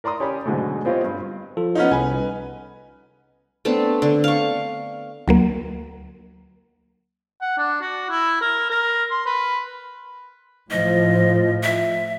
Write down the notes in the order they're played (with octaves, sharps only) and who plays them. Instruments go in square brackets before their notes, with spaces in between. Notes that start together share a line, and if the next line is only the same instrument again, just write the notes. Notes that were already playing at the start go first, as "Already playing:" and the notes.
[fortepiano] A#4 D5 A#5 C6 D#6
C#4 G4 D5 B5
G#2 B2 D3 F#3 G#3 A3
B3 C4 F4 G4 C#5 D#5
G2
[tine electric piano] F3 F4 A4
[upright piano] B3 C#4 D#4
[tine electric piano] C2 [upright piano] B4 G#5
[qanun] A3 B3 C4 D4
D3
F5 C#6
[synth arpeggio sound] D2 F#3 A#3
[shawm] F#5
D4
F#4
E4
A#4
A#4
C6
B4
[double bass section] A2 F3 [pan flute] D#5
[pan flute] E5